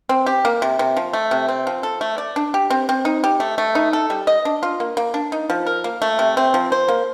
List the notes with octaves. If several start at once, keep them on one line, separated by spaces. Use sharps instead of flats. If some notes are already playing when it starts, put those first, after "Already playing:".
C4
G4
A#3
C3
C3
F3
A3
C3
C4
F3
A4
A3
D5
D4
G4
C4
C4
D#4
G4
A3
A3
D#4
A4
G3
D#5
D4
F4
A#3
A#3
D4
D#4
F3
A#4
A#3
A3
C3
C4
F3
C5
A#3